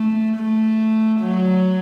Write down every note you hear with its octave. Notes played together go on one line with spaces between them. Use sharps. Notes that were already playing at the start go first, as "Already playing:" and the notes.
Already playing: A3
A3
F#3